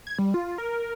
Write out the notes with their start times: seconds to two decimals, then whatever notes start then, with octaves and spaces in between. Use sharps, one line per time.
0.07 G#6
0.19 G3
0.34 F4
0.58 A#4